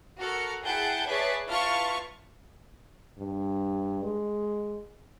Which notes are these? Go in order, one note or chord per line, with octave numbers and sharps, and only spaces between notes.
F#4 A4 A#4 F6 C#7
E4 G#4 F#5 G5 A5 G6
G#4 B4 C#5 D5 E5 A5
E4 F4 B4 A5 C#6 F6
G2
G#3